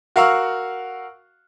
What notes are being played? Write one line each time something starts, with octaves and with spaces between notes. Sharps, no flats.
F#4 A#4 F5 F#5 C#6 E6